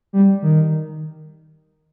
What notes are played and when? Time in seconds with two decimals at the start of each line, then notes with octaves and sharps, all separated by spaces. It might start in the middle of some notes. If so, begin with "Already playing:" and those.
0.13 G3
0.42 D#3